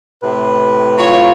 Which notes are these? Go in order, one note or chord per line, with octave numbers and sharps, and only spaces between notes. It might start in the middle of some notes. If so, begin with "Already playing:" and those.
A2 C3 B4
F#3 F4 C#5